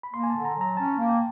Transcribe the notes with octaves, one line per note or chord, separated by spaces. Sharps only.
B5
A#3 C6
G#5
D3 A5
A#5
F#3 A#5
C#4 A5
A#3
G5